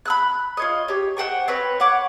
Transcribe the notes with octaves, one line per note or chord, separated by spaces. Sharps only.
B5 E6 F#6
F4 C#5 D#5
G4 C#5
C5 F#5 G5 C#6
C4 B4 C#5
C#5 F#5 C#6 D6